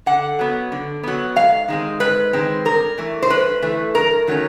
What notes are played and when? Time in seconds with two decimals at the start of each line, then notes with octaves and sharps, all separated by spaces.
0.06 D3 F#5
0.39 F#3 B3
0.72 D3
1.03 F#3 B3
1.36 G#2 F5
1.68 D#3 G#3 C4
2.00 G#2 B4
2.33 D#3 G#3 C4
2.65 G2 A#4
2.98 E3 A3
3.22 C5
3.30 G2 B4
3.62 E3 A3
3.95 G2 A#4
4.27 D#3 F#3 A3 C#4